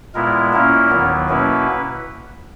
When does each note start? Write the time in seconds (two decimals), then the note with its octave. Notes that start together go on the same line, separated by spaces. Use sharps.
0.15 A#2 G#3 B3 E4 A#4
0.53 A#2 A#3 C#4 E4 A#4
0.91 D#2 D#3 F#3 B3
1.29 B2 A#3 C#4 E4 B4